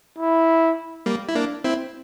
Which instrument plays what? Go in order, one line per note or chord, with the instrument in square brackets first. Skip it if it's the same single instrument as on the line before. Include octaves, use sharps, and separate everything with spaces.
[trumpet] E4
[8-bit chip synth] G3 A#3
E4
A#3 D4
C4 E4